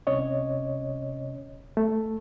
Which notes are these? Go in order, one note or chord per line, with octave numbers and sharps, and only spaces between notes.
C2 C3 C#4 C#5 D#5
A3